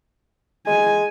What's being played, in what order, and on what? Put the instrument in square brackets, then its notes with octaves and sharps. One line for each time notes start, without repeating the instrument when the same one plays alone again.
[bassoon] G#3 [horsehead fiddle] G#5